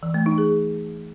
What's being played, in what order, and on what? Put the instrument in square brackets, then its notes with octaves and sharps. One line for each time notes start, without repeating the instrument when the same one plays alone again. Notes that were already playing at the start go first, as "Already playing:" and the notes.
[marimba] E3
A3
D#4
G#4